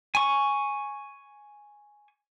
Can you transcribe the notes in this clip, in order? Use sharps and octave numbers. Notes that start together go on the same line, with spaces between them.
G#5 C#6